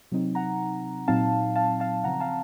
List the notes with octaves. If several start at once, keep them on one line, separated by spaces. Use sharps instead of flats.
C3 F#3 C4 D#4
F#5 A#5
A#2 F#3 C4 D#4 F5 A5
F5 A5
F5 A5
C#3 F3 C4 F#5 A#5
F5 A5